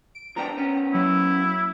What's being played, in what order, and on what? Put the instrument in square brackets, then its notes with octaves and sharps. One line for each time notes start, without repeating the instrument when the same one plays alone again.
[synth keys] D7
[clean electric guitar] F3 B3 D4 [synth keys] G5 A#5
[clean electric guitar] B3 C#4
[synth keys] F#3 A#3 [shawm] E4